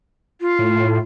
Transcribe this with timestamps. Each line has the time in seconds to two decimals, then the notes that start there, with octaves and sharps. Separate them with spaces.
0.41 F4
0.59 A2